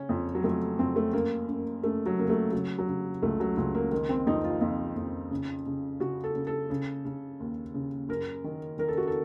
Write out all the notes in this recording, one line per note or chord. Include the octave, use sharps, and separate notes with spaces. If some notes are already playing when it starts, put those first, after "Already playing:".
Already playing: C#3 C#4
F2
F#3
F2 A3
F2 C4
A3
F#2 A#3
F#2
F#2 A3
F#3
C#3 A#3
A3
C#3 F#3
F#3
C#3
C#2 A3
F#3
C#2
A#3
D#3 A#3
C4
F2 D#4
F4
F2
F2
C#3
C#3
C#3 F#4
A4
C#3
A4
C#3
C#3
D#2
C#3
F#2 A#4
D#3
D#3 A#4
A4
F#4
A4